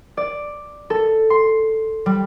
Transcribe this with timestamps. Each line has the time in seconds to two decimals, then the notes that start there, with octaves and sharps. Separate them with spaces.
0.17 D5
0.90 A4
1.30 C6
2.06 G3